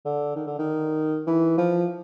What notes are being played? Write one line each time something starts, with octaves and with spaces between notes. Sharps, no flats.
D3
D#3
D3
D#3
E3
F3